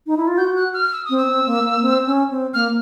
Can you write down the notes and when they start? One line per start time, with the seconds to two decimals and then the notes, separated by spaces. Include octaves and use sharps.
0.07 D#4
0.17 E4
0.27 F4
0.38 F#4 G6
0.56 F#6
0.74 F6
0.92 E6
1.05 C4 D#6
1.17 E6
1.28 C4
1.47 A#3
1.64 A#3
1.82 C4
2.06 C#4
2.30 C4
2.54 A#3 F6